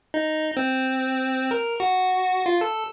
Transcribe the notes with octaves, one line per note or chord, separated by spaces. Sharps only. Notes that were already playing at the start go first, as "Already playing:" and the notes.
D#4
C4
A#4
F#4
F4
A4